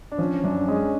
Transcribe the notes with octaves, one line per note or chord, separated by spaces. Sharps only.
D4
F3 C#4
F#2 D4
G#3 C#4